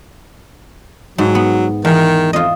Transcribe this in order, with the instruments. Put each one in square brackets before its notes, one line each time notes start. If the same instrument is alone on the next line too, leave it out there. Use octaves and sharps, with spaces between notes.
[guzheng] G#2 [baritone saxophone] F#3
[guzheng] B3
[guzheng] E2 [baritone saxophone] D#3
[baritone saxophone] F2 [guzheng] F4 D#5